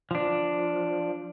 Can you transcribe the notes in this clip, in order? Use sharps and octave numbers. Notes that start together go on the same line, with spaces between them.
F3 D4